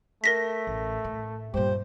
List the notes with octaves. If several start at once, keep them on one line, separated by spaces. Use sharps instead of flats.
A3 A#4 A#6 B6
A1
A2
G2 A#2 G4 C5